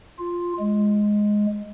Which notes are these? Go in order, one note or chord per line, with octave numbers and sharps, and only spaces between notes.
F4
G#3